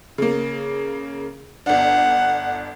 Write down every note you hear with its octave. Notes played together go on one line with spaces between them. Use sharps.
C#3 A#3
G1 D4 F#5